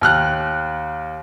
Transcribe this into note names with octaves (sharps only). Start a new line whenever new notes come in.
D#2 F6 F#6